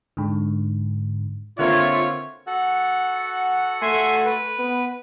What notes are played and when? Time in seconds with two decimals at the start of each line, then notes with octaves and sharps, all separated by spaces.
0.17 G#2 D3
1.59 D3 A#3 C4 F4 C#5 E5
2.47 F#4 A4 F#5
3.82 A3 E5 G#5 C6
4.26 B4
4.58 B3